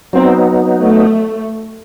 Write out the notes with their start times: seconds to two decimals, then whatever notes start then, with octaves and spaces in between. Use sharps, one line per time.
0.13 F#3 B3 C4 D#4
0.79 A3